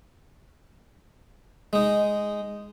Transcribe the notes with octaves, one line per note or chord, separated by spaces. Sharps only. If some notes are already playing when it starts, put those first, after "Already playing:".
G#3 D#4